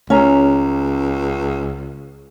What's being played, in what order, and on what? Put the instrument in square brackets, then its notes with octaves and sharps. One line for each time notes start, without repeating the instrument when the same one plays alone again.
[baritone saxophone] C#2 [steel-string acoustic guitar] C#4 A#5